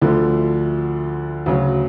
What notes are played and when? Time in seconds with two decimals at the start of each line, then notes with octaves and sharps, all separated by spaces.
0.01 D2 D3 F3 A3
1.46 D2 C#3 F#3